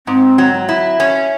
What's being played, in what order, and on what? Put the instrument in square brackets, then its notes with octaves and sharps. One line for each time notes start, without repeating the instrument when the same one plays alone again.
[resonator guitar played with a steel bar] G#2 [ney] C4
[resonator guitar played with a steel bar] F#3
E4
C#4